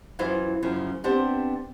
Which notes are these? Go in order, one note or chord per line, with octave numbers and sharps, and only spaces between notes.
F#2 E3 E4 F4 C5
F#2 C#3 F3
B3 C4 D4 G4